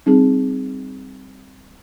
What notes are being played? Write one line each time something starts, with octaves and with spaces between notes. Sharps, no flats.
G3 C4 D#4 G#4